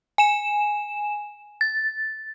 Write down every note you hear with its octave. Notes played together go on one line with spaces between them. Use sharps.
G#5 E7
A6